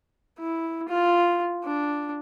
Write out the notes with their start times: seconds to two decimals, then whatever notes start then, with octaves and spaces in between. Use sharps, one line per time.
0.39 E4
0.88 F4
1.64 D4